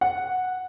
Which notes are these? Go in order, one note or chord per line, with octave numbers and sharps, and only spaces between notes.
F#5